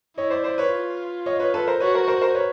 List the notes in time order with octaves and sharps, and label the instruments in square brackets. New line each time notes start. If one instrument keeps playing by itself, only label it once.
[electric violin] E4 [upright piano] C#5 D#5
[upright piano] C5 D5
C5 D5
B4 C#5
[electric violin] F4
[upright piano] C#5 D#5
B4 C#5
A4 B4
A#4 C5
[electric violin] F#4 [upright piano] B4 C#5
[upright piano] A#4 C5
A#4 C5
A#4 C5
B4 C#5